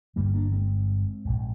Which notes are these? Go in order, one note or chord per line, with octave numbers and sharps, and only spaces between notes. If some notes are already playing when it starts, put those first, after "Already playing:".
G1 G2 D3 G3 A#3
A#3 D4
G#3 C4
A#1 G#2